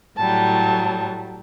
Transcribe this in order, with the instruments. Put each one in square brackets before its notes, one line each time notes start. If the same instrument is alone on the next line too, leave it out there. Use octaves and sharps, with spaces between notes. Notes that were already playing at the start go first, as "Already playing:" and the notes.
[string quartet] A2 F#3 G3 [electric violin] A5